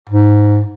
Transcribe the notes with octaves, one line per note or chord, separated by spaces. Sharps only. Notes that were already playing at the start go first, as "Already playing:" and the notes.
G#2